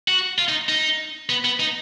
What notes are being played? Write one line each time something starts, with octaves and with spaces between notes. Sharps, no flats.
F#4
F4
D#4
D#4
B3
B3
D#4